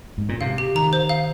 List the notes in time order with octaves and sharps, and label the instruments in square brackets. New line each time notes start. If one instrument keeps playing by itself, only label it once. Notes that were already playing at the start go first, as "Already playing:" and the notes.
[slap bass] G#2
A#2
[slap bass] C3 [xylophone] F5
[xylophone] G4
[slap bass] D#3 [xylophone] A#5
[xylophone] C5
F5